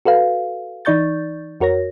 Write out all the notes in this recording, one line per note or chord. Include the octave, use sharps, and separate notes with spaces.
F#4 A4 B4 F5
E3 D#4 D5 C#6 G6 A6
F2 F#4 A#4 C#5 A#6